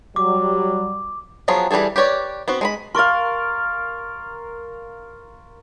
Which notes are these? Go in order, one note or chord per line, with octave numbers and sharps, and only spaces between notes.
F#3 G3 D6
F3 F#3 B3 F4 G#4
E3 G3 A3 G#4 A4
G4 B4 C#5 D5
B3 C4 F#4
G#3 A#5 B5
A#4 F5 C6 C#6 A6